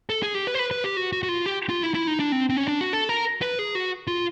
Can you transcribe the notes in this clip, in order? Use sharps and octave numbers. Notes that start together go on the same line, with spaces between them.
A4
G#4
G4
B4
C5
B4
B4
G4
F#4
F#4
F#4
F4
G4
F4
E4
E4
D#4
D4
C4
C4
C#4
D4
F#4
A4
A#4
B4
G#4
F#4
F4